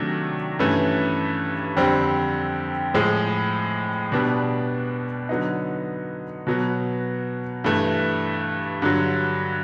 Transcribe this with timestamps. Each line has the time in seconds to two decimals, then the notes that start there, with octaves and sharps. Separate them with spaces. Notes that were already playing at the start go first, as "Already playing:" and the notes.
Already playing: C3 D#3 F#3 A3 D4
0.59 G2 E3 A3 C#4
1.77 F2 D3 G3 C4
2.94 A2 F3 G#3
4.12 B2 G3 B3 D4
5.29 D3 F#3 B3 D#4
6.47 B2 F#3 B3
7.64 G2 E3 A3
8.82 G2 D3 F#3